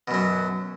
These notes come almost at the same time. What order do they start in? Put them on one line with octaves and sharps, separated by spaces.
B2 F#2 F#3